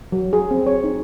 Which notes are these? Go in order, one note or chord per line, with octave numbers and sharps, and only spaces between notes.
F#3
G#4
C4
C#5
D#4